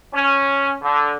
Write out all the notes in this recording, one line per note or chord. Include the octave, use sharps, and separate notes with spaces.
C#4
D3